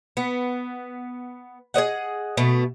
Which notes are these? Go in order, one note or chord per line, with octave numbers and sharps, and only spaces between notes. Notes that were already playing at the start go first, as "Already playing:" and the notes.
B3
G#4 C5 D#5 F#5
B2 A3